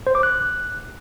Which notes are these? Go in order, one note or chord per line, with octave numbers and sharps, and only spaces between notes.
C5
D6
F#6